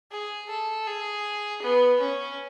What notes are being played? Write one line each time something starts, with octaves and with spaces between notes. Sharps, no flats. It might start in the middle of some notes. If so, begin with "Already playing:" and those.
G#4
A4
G#4
B3
C#4